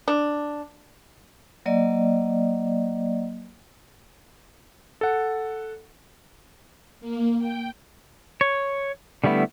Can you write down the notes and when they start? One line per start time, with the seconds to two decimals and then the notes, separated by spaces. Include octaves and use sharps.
0.08 D4
1.66 F#3 A#3 D5 D#5
5.01 A4 F#5
7.01 A#3
7.39 G5
8.41 C#5
9.24 D3 G3 A3 B3 E4